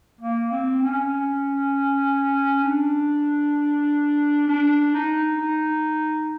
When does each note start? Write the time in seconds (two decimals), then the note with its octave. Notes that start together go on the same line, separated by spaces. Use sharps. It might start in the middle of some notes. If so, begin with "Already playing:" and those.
0.21 A#3
0.51 C4
0.82 C#4
2.64 D4
4.48 D4
4.94 D#4
5.39 D#4